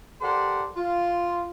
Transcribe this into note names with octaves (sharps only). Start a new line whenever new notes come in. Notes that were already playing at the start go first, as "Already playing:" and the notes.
G4 A4 A#4 C5 D5 F#5
F4